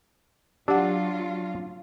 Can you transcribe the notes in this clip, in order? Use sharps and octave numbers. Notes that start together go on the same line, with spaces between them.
F#3 D4 F4 G4 F#5